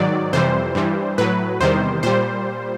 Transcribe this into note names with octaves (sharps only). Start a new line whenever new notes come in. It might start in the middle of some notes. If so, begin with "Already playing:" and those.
Already playing: G#2 D#3 F#3 D5
F2 C3 E3 G3 C5
G2 E3 G3
A2 F#3 B4
E2 C3 D#3 G3 C5
A#2 G3 C5